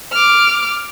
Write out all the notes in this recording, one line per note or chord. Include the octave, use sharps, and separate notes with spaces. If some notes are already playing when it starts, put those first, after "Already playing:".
D6 F6